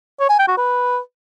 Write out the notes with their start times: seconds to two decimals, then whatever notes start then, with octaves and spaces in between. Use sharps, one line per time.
0.20 C#5
0.30 G#5
0.39 G5
0.48 F#4
0.58 B4